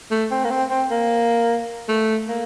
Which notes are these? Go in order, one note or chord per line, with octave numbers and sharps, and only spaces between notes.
A3
C4
A#3
C4
C4
A#3
A3
A#3